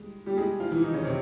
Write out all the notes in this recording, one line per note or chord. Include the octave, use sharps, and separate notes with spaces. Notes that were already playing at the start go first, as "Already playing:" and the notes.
Already playing: G3 G#3
G3 G4
G#3 G#4
F3 F4
E3 E4
D#3 D#4
C#3 C#4
C3 C4